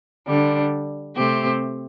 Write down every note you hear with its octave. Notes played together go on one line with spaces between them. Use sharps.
D3 G3 D4
C3 A3 C4 G4 C5